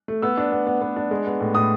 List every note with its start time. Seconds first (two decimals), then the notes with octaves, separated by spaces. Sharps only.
0.08 A3
0.22 B3 E6
0.37 D4
0.52 B3
0.67 B3
0.81 B3
0.96 D4
1.11 G#3
1.26 B3
1.40 A2
1.55 A2 D#6